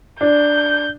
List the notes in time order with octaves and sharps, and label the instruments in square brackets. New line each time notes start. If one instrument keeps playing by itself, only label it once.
[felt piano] D4 [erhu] G6